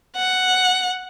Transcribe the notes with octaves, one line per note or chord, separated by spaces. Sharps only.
F#5